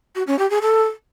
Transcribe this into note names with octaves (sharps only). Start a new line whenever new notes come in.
F#4
C#4
G4
G#4
A4